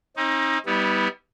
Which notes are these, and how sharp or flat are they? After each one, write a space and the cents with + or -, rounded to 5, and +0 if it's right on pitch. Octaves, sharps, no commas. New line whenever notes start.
C4 +45 D#4 +20
G3 +0 B3 +0 E4 -45